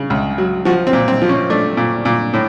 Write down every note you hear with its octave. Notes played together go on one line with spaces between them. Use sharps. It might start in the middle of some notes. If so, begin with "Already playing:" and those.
Already playing: C#3
C#2
F#3
F3 F#4
C4
A#2
C4
F3
C#4
A3 D4
A#2
A#2
A2